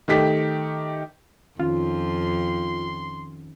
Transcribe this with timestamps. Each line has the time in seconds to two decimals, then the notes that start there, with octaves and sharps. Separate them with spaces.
0.08 D#3 A3 G4 B6
1.60 F2 D#3 C#4 F4 C6